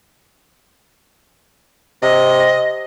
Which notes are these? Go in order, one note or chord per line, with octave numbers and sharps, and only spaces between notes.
C3 D#5